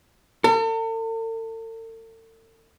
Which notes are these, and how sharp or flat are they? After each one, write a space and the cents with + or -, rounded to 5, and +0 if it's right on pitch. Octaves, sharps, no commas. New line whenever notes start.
A4 +45